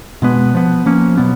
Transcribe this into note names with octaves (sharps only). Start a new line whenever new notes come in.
B2 G#3 B3
F3 B3
F3 A#3 C#4
B2 F#3 B3